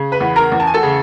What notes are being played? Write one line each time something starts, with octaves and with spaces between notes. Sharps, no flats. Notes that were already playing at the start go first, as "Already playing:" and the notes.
Already playing: C#3
B4 B5
E2
A#4 A#5
E2
A5
G#5
A4 A5
C#3